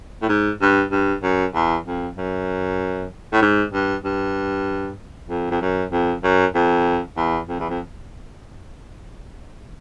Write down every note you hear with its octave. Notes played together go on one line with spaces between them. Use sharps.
A2
G#2
G2
G2
F#2
E2
F2
F#2
A2
G#2
G2
G2
F2
F2
F#2
F2
F#2
F2
E2
F2
E2
F2